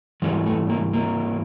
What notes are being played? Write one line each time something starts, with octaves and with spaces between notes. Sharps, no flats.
G#2 E3 G3 G#3
A3
A#3
A#3